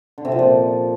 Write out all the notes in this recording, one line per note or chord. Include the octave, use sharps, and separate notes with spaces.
D3
C3
F3
A#2